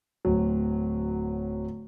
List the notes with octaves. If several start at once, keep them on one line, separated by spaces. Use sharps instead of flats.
D1 F#3